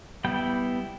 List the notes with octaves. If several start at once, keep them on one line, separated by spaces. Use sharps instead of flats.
G3 B3 E4 G5